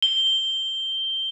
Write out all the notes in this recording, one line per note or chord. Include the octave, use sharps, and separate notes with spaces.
G7